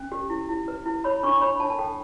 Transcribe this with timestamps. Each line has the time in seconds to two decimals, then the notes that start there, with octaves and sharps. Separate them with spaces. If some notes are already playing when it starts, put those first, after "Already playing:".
Already playing: C#4
0.12 G4
0.30 E4
0.49 E4
0.68 B4
0.86 E4
1.04 C#5 B5
1.23 D4 C#6
1.41 C#5 B5
1.60 D4 A5
1.70 A5
1.79 A4 G5